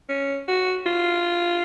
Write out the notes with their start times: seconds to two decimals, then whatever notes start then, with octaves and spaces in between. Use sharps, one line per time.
0.09 C#4
0.48 F#4
0.86 F4